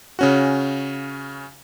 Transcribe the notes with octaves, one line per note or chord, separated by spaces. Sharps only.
C#3 C#4 F#4